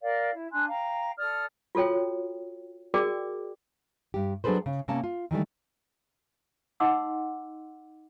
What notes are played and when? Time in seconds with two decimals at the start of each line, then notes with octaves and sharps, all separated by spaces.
0.01 A#4 D5 F5
0.33 E4
0.52 D4 G#5 C6 F#6
0.68 F5 G5 A#5
1.17 A4 D5 D#6 F6
1.75 F4 F#4 A4 C#5 G5
2.94 F#4 G#4 A#4 D5 G5 D6
4.14 G2 G4
4.44 F#3 D4 G#4 A4 B4 C5
4.66 C#3
4.88 C3 A#3 C#4 A5
5.04 F4
5.31 D#3 E3 G3 A3
6.80 D#4 D#5 F#5 C6 D6 E6